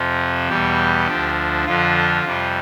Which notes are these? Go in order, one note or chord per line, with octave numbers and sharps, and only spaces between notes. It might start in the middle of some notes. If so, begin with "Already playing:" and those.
Already playing: F2 C3 F3
E2 B2 G3 G4
D2 D3 F3
F2 D3 F3 F4
F2 C3 G3